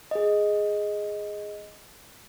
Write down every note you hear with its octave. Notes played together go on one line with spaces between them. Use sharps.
G#4 D#5